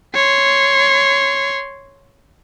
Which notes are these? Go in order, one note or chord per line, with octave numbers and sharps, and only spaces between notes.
C#5 C6